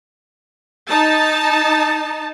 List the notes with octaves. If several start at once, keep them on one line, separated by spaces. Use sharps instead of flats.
D#4 A5